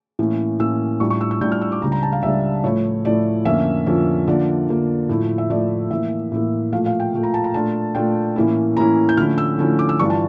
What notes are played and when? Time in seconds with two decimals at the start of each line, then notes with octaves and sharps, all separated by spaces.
0.19 A2 E3 A#3 C#4
0.60 A2 E3 A#3 C#4 E6
1.00 A2 G3 D4 F4 C#6
1.10 C#6
1.21 E6
1.31 E6
1.41 A2 G3 D4 F4 G6
1.52 F6
1.61 E6
1.72 D6
1.82 C#2 C#3 G3 D4 A#5
1.92 A#5
2.03 A5
2.12 F5
2.22 C#2 C#3 G3 D4 E5
2.64 A2 F3 A3 E4 C#5
3.05 A2 F3 A3 E4 D5
3.45 F2 D3 F3 A#3 C#4 E5
3.86 F2 D3 F3 A#3 C#4
4.27 D3 F3 A#3 D5
4.68 D3 F3 A#3
5.09 A2 F3 A3 E4
5.38 E5
5.50 A2 F3 A3 E4 D5
5.91 A2 E3 A#3 E5
6.32 A2 E3 A#3
6.73 A#2 F3 A3 F5
6.86 F5
7.00 G5
7.13 A#2 F3 A3
7.23 A#5
7.34 A5
7.44 A#5
7.54 A#2 A3 D4 F4 A5
7.95 A#2 A3 D4 F4 G5
8.36 A2 E3 A#3 C#4 E4
8.76 A2 E3 A#3 C#4 E4 A#5
9.09 G6
9.17 D3 F3 A3 C#4 E4 F6
9.38 E6
9.58 D3 F3 A3 C#4 E4
9.79 D6
9.89 E6
9.99 G2 E3 G3 D4 F4 C#6
10.10 A5